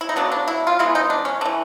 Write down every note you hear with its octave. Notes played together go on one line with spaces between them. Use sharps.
E4
D#4
C#3 F#3 B3 D4
D4
E4
F4
E3 G#3 B3 E4
D#4
D4
C#4
E3 A3 D4